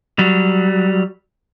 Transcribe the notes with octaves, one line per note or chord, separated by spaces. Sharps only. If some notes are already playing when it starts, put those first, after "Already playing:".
F#3 G3